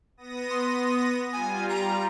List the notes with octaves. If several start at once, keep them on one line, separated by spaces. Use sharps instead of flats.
B3 D#6 A#6
C6
G3 F4 G#5
A#5